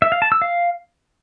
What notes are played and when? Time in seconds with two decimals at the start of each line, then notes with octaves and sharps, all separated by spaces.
0.02 E5
0.12 F5
0.22 A5
0.32 E6
0.42 F5